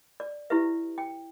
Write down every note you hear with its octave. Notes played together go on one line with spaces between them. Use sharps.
D5
E4 G4 B4 E5
G5